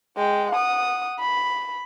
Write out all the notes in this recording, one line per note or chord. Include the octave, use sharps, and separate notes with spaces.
G#3 G5
F#5 D#6
B5